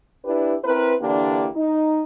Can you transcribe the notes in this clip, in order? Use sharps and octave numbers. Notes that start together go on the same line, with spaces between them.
D4 E4 G4 B4
C4 E4 A#4 B4
D3 E3 A#3 D4 E4 G4
D#4